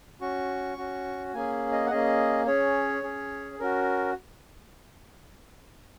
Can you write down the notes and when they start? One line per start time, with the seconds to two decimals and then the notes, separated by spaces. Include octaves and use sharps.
0.21 C#4 F#4 C#6
0.77 C#4 F#4
1.34 A#3 C#4 G#4 G#5
1.72 D#5
1.86 F#5
1.90 A#3 C#4 G#4 D#5
2.47 C#4 G#4 C#5
3.03 C#4 G#4
3.60 C#4 F#4 A#4